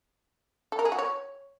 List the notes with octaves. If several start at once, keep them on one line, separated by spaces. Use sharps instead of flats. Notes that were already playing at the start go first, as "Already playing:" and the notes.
A4
A#4
G#4
F#4
C#5